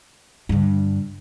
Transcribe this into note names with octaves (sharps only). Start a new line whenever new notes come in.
G2 D3